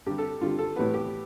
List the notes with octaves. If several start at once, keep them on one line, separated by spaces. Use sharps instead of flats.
G2 D3 G3 G4
A4
G2 D3 G3 F4
A4
A2 E3 G3 B3 B4
G4